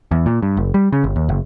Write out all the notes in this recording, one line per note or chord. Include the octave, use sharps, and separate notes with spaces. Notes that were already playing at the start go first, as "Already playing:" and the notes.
E2
A#2
G2
F#1
G3
C#3
G1
D#2
F#1